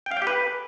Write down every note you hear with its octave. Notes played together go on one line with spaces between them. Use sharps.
G5
F5
G5
G4
B4